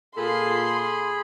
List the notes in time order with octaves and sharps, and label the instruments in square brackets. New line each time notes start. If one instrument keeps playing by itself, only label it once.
[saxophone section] A#2 F4 A4 [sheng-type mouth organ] G#4 B5 [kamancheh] C6